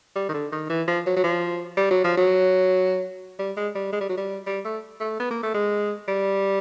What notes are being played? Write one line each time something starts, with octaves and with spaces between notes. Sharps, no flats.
G3
D#3
D3
D#3
E3
F3
F#3
F#3
F3
G3
F#3
F3
F#3
G3
G#3
G3
G#3
G3
F#3
G3
G3
A3
A3
B3
A#3
A3
G#3
G3